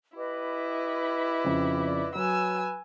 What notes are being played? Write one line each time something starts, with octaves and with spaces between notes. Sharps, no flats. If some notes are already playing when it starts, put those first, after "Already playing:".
E4 G4 B4 D#5
F2 C#3
D5
F#3 B4 G#5 E6